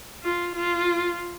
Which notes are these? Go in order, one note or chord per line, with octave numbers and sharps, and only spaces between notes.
F4
F4